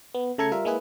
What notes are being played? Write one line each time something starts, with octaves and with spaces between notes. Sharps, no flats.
B3
C#3 A3 A4 A#5 G#6 C#7
G3 F4 A#4 E5
G#3 A#3 E4 G#4 B4